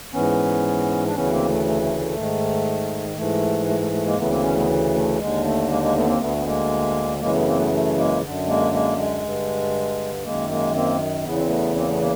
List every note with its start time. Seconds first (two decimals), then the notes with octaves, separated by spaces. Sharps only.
0.13 G#2 E3 B3 C#4
1.07 D4
1.14 D2 C#3 E3 B3 C#4
1.31 A#3 C4
1.48 A3
1.65 A3
1.82 A3
1.99 A3
2.16 G#2 D#3
3.17 G#2 E3 A3
3.67 A3
3.80 A3
3.92 A3
4.05 G#3 A#3
4.17 D2 C#3 E3 A3 B3
4.30 A#3 C4
4.43 B3 C#4
4.55 A3 B3
4.94 A3
5.19 D#2 D3 G#3
5.44 A3
5.69 G#3 A#3
5.82 G#3 A#3
5.95 A3 B3
6.07 A#3 C4
6.20 D2 D3 A3 B3
6.36 B3
6.46 G#3 A#3
7.20 F#2 C#3 E3 G#3 A#3
7.34 A3 B3
7.47 A#3 C4
7.59 A3 B3
7.72 A3
7.97 G#3 A#3
8.22 F#2 D3
8.47 G#3 A#3
8.73 G#3 A#3
8.98 G#3
9.23 G2 D3
10.24 F#2 D#3 G#3 A#3
10.49 G#3 A#3
10.74 A#3 C4
11.25 E2 C#3 E3 B3
11.36 C4
11.47 A3 B3
11.76 A#3 C4
11.88 A3 B3
12.01 A#3